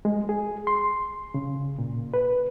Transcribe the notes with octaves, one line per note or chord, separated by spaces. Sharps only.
G#3
G#4
C6
C#3
A#2
B4